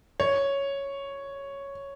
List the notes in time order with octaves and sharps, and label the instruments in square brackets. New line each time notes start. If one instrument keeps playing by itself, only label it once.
[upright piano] C#5